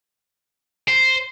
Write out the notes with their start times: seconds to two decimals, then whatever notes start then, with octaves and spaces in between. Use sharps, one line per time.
0.88 C5